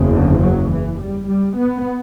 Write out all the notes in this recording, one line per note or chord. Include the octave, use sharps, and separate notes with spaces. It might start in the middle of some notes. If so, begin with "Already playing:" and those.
Already playing: F#1 E2 C#3
D3
F#3
E3
G3
G3
B3